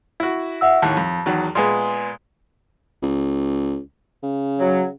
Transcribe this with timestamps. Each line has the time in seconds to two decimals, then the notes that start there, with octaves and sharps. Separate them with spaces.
0.20 E4 F#4
0.61 E5 F#5 E6
0.82 D#2 A2 F#5 A5
0.97 F2
1.26 E2 D#3 F#3
1.55 A#2 G#3 B3 G#5 C6
3.02 C#2
4.23 C#3
4.59 F#3